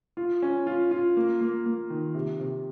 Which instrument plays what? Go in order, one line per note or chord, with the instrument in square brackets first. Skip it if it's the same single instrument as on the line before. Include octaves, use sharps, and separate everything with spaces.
[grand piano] F4
C#4
F4
F4
A#3
A#3
A#3
D#3
C3
C3